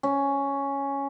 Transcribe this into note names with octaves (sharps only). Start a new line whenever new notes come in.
C#4